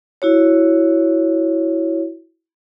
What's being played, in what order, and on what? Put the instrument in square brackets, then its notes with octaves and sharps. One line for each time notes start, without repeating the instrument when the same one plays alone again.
[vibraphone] E4 F#4 C#5